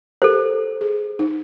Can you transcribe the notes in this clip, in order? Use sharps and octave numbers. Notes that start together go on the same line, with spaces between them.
G4 A4 A#4 C5
G#4
D#4